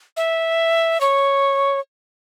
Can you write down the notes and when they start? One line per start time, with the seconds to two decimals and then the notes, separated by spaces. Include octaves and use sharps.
0.17 E5
1.01 C#5